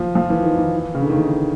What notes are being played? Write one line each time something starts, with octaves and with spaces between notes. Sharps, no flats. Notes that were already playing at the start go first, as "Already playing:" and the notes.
Already playing: F3
F3
E3
D#3
E3
C#3
D3
D#3
E3